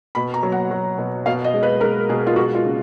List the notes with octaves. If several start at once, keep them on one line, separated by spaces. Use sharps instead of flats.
B2 B5
A#5
F#3
F#5
F#3
B2
B2 F5
D#5
G#3
B4
G#3 A#4
B2 G#4
F4
G#3 F#4
F4
C#3